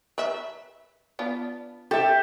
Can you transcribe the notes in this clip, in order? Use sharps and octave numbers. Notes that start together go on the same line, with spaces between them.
A#4 B4 E5
B3 D4 F4
G4 A4 E5